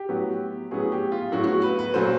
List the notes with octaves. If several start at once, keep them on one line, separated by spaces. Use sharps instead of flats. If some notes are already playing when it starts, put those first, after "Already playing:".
Already playing: G4
A2 F#3 B3
A2 F#3 B3 G#4
G4
F4
A2 F#3 B3 F#4
F#4
B4
B4
A#2 F#3 A3 C5